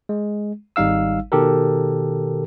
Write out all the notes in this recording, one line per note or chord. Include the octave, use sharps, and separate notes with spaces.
G#3
G#1 G3 D#4 F5 E6
B2 D#3 G4 A4 A#4